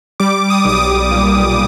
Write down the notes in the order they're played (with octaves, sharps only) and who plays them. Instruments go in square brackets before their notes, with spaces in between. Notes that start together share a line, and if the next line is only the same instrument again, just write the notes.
[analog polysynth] G3 D6
D#6
B1 D#6
D6
A#2